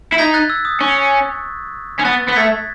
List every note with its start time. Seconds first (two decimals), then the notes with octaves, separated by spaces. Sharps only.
0.12 E4
0.18 D#4 G#6 B6
0.34 F#6 A6
0.50 E6 G#6
0.65 D#6
0.80 C#4 C#6
1.99 C#4
2.05 B3 F#6 A6
2.28 B3
2.36 A3 G#6 B6